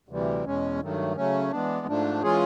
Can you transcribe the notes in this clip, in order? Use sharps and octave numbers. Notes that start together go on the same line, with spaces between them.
D2 C3 E3 G3
E2 B2 G#3 C#4
G2 D#3 F#3 A3
C#3 F#3 A3 C#4
E3 G#3 B3 D4
G#2 F3 A3 D4
E3 G#3 C#4 F4 G#4